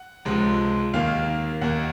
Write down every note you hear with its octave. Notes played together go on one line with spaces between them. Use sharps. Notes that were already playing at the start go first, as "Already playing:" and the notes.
Already playing: F#5
C#2 C3 F3 G#3
D#2 D#3 A#3 F5
D#2 D#3 A#3 F#5